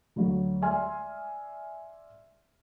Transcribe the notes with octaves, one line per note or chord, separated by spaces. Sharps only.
D2 D3 F#3
D5 E5 G#5 C6 F6